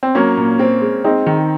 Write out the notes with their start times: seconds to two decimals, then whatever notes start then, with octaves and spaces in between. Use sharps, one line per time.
0.03 C4
0.15 F#3 A#3 C#4
0.37 A#2
0.59 C4
0.81 G#3
1.04 G#3 C4 D#4
1.26 D#3